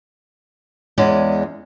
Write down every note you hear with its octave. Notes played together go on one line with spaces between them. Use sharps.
E2 G#3 C#4 D5